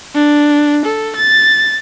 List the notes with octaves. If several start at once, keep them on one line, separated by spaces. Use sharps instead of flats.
D4
A4
A6